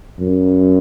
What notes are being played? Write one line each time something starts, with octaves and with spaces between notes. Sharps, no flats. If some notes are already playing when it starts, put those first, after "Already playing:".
F#2